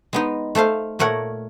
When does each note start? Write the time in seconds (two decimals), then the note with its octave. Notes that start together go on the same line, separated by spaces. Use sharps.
0.13 G#3 B3 D#4
0.55 A3 A4 C5 F5
0.99 A#2 A3 A#4 C#5 F#5